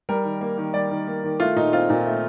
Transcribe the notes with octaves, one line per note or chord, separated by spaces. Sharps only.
G3 A#4
D#3
A#3
D#3
G3 D5
D#3
A#3
D#3
A3 F4
A#2 D#4
C4 F4
A#2
A3